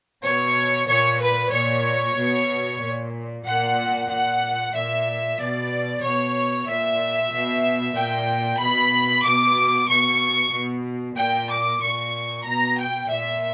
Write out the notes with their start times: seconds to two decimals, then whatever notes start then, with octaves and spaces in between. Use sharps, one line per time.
0.24 B2 C#5
0.89 A#2 C#5
1.21 B4
1.52 A#2 C#5
2.17 B2
2.82 A#2
3.45 A#2 F#5
4.10 A#2 F#5
4.75 A#2 E5
5.39 B2 D5
6.02 B2 C#5
6.68 A#2 E5
7.32 B2
7.95 A#2 G5
8.60 B2 B5
9.24 B2 D6
9.89 B2 C#6
10.53 B2
11.17 A#2 G5
11.50 D6
11.82 A#2 C#6
12.45 B2 A#5
12.77 G5
13.10 A#2 E5